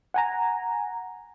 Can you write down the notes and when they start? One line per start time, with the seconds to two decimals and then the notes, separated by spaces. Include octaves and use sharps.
0.14 F#5 G#5 A#5